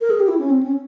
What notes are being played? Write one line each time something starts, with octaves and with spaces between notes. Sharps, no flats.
A#4
G#4
G4
E4
C#4
C4
C#4